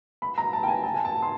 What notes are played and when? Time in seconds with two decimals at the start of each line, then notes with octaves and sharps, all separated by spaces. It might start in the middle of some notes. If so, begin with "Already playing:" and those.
0.22 B5
0.38 A#5
0.53 A5
0.63 G5
0.68 G#5
0.84 A5
0.94 G#5
1.05 A5
1.22 C6